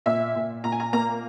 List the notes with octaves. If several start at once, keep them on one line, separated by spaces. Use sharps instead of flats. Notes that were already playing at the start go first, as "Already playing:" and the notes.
A#2 E5
A#2
A#2 A#5
G#5
A#5
A#3 A#5